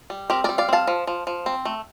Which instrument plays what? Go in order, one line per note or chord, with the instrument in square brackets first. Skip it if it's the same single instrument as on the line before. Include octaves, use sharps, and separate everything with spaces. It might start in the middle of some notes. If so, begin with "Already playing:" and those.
[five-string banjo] G3
C4 G4 A#4
G3 A#4 D5
D5 F5
C4 F5 A5
F3
F3
F3
C4
A3